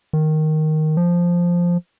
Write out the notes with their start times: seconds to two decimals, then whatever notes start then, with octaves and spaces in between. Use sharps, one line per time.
0.13 D#3
0.97 F3